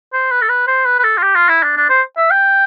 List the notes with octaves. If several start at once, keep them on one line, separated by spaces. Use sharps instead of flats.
C5
B4
A4
B4
C5
B4
B4
A4
F4
G4
F4
E4
D4
D4
C5
E5
G5